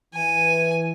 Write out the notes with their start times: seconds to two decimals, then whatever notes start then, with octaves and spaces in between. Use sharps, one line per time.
0.14 E3 G#5